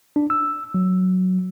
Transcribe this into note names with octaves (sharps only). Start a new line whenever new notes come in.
D4
E6
F#3